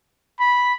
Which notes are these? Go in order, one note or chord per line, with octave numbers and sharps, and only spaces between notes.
B5